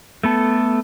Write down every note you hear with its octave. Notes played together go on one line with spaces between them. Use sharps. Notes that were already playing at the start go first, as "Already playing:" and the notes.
A3 B3 A4